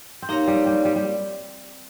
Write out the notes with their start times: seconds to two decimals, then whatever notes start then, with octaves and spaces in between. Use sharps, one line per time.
0.22 C4
0.29 A#3 D#4 G4 A#4 C#5 F5
0.47 G3
0.66 G3
0.85 G3
0.96 G3